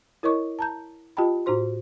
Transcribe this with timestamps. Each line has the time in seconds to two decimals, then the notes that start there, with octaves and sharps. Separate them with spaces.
0.23 E4 A#4 C#5 D#5 C#6 D6
0.59 A5 A#5 G6
1.17 F4 G4 D#5 G5 A5 B5
1.46 A2 D#4 F#4 C5 C6